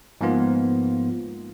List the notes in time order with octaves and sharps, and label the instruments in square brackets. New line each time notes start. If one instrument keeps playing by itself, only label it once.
[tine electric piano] G#2 F3 A#3 B3 F4